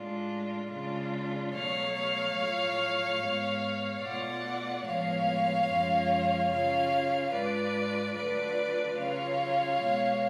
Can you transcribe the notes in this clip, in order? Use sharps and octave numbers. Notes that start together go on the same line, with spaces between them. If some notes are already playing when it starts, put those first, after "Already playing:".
Already playing: A2 G#3 D4 F4
C#3 G#3 D4 F4
B2 F#3 A3 C#5 F5
A2 F#3 A3 F4
G#2 G#3 B3
B2 A3 F4 D5 F#5
A2 F3 G#3 B3 C#5 F5
F#2 F3 G#3 C#4 F4
C#3 F#3 C#4 F4 C#5 F5
G#2 G#3 D4 F4 B4 D5
D3 F#3 A3 D4 F4 B4 D5
C#3 F#3 C#4 F4 C#5 F5
B2 G#3 B3